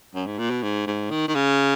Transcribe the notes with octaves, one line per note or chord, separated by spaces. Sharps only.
F#2
G#2
A#2
B2
G#2
G#2
D#3
D#3
C#3